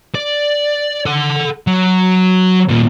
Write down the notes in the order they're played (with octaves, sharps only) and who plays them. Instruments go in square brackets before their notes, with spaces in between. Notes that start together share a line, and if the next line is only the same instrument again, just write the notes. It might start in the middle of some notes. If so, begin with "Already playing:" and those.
[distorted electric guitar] D5
A4 F#5
F#3
D#2 A#2